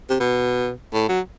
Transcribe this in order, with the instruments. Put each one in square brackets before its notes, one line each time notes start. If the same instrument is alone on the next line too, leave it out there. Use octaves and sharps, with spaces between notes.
[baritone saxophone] C3
B2
A2
F#3